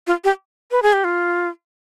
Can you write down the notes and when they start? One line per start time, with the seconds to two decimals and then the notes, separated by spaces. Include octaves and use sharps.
0.07 F4
0.24 G4
0.71 B4
0.83 G#4
0.93 G4
1.04 F4